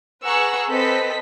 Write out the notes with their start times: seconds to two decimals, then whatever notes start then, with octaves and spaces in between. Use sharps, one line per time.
0.24 G#4 B4 F#5 A#5 C#6 E6
0.69 C4 A4 B4 D#5 B6